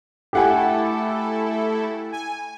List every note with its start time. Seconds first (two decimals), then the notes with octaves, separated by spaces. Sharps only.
0.33 A3 E4 G4 A4 F#5 G#5
2.12 G#5